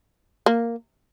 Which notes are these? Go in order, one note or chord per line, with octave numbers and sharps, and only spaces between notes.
A#3